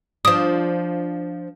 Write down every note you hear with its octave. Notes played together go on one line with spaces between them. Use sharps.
F3 D4 D#6